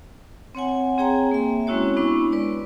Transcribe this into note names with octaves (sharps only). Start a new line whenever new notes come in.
C4 C#5 F#5 G#5
C4 G#4 C#5 G5 G#5 A#5
A#3 E5
G#3 C4 C#4 E4 F#4 C#5
G#3 B3 D4 E4 C#6
B4 D5